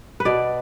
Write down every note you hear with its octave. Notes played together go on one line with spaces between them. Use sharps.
B4
B2 D5